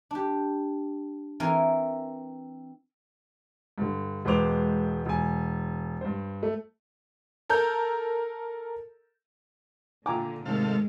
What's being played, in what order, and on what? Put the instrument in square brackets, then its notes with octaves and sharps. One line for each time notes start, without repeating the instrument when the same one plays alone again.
[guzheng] D4 G4
E3 C4 A#4 G#5 C6
[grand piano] G2 D3
E1 G#3 B4 C5 D6 F7
E1 G#5
G2 C5
A3
[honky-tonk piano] A4 A#4 A#5 G6
[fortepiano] A#2 A#5 D6 [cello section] D3 [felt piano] G5 G#5
[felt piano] G#2 D#3 A3 [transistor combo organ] C3 A4 F5 [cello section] G#3